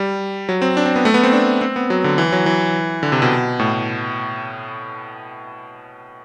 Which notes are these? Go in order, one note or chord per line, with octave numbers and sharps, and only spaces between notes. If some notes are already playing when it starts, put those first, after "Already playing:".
Already playing: G3
F#3
C4
D4
C4
B3
A3
B3
C4
D4
C4
B3
F#3
D3
E3
F#3
E3
D3
C3
B2
A2